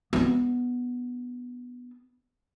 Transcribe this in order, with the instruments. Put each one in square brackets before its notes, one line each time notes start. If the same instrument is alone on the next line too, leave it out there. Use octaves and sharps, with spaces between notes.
[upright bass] B3 D4